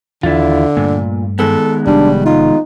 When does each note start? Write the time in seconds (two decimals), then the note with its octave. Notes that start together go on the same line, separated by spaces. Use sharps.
0.23 D#2 D3 E3 E4 F4
0.77 G2 A#2 A3
1.39 D#3 G#3 B3 A4
1.87 F1 G3 D4
2.25 D#4 F4